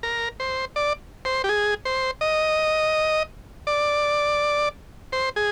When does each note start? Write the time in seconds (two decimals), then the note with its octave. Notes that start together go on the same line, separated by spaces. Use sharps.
0.03 A#4
0.40 C5
0.76 D5
1.25 C5
1.44 G4
1.49 G#4
1.85 C5
2.21 D#5
3.67 D5
5.12 C5
5.36 G#4